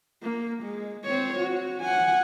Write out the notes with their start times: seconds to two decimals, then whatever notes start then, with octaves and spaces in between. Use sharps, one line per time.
0.23 A#3
0.63 G#3
1.05 C4 C#5
1.39 F#4
1.81 F#5 G#5